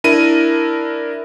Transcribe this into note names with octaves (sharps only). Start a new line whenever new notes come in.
D4 E4 A#4 D#7